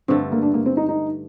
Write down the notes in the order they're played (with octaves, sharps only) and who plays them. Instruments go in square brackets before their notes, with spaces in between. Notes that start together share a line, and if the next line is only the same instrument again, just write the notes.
[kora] G2 D3 A3 [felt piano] C4
[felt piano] A#3
D4
A#3
C4
D#4
D#4